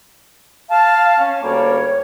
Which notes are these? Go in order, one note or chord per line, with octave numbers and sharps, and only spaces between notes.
F5 A5
C#4
D2 G3 A#3 C#5